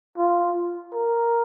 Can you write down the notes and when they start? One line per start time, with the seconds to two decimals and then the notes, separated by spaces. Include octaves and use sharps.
0.17 F4
0.93 A#4